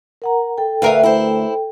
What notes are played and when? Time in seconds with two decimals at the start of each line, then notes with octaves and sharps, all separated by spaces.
0.22 A#4 F#5 A#5
0.58 A4 G5
0.82 D2 A#4 B4 E5 F5
1.03 E4 C5